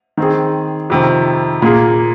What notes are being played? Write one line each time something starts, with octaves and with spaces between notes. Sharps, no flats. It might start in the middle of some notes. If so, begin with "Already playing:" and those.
D#3 C4 G#4
F2 C3 D#3
A#2 A#3 G#4